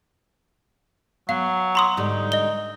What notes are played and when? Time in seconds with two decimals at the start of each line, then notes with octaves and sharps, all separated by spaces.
1.29 F#3 B3 F5
1.75 A#5 C6 D#6
1.97 G#2 D3 G3 D#4
2.32 D#5 G7